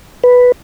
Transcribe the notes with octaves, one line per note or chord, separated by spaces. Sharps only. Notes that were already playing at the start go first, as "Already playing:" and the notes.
B4